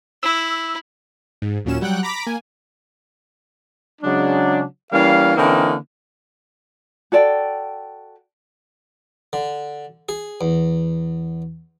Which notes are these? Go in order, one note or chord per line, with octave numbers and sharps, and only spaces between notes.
E4 E6
G#2
D#2 A#2 F#3 C#4 E7
F#3 G3 F#5 G5 F#6
A#5 B5 D6 B6
A#3 G#5
C#3 F#3 G#3 D4
E3 G3 A#3 C#4 F5
D3 E3 A#3 C4 C#4 D#4
F#4 A4 D5 G5
D3
G#4
E2